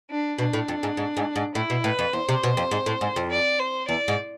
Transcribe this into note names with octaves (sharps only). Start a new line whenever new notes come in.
D4
B2 D4
A2
F2
G#2
G#2
G#2
G#2
A2 E4
B2
A2 B4
F2
E2 C5
C3
B2
F2
G#2
A2
G#2
F2
D5
C5
E2 D5
G#2